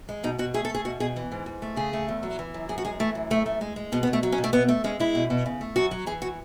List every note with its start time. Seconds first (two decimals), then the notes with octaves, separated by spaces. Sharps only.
0.09 G#3
0.23 B2 D#4
0.39 B2 F#4
0.54 A3 G#4
0.65 A4
0.70 A3 G#4
0.85 B2 F#4
1.00 B2 G#4
1.16 E3
1.32 G#2
1.46 G#2
1.62 A3
1.76 C#3 G#4
1.93 A3
2.09 E2
2.23 F#3
2.39 E3
2.54 F#2
2.69 F#2 G#4
2.78 F#4
2.85 G#3 G#4
3.00 E3 A3
3.15 F#2
3.30 F#2 A3
3.46 A3
3.61 G#3
3.76 G#3
3.92 B2 B3
4.03 B3
4.07 B2
4.13 A3
4.23 F#3
4.32 C#4
4.38 B2
4.44 A3
4.53 B2 B3
4.69 A3
4.84 G#3 C#4
5.00 G#3 E4
5.15 B2
5.30 B2
5.46 C#3
5.61 A3
5.76 F#2 F#4
5.91 F#3
6.06 E3 G#4
6.22 F#4